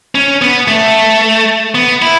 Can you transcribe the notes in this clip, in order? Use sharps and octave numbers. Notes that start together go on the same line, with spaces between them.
C#4
B3
A3
B3
E4